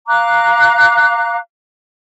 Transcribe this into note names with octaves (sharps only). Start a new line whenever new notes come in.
F5 A#5 D6 F#6